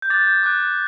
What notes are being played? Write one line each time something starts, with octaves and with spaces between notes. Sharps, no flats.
G6
D6 F#6 A6
G6
D6 F#6